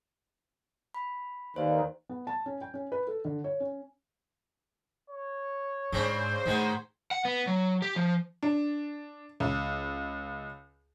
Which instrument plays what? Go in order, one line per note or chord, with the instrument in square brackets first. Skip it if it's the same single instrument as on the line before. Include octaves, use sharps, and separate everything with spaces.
[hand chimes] B5
[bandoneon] D#2 [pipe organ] D#3 [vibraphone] B4 D5 F5 [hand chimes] C5
[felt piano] B3
A5
C#4
G5
C#4
B4
A4
D3
C#5
C#4
[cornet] C#5
[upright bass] G#2 [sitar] C#3 C4 D4 [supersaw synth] C5
[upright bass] A2 [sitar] D#3 G#3 B3
[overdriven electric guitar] F#5
B3
F#3
G4
F3
[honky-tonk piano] D4
C#2